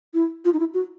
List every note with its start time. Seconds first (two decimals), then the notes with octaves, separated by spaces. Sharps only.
0.14 E4
0.45 F4
0.53 D#4
0.59 E4
0.74 F#4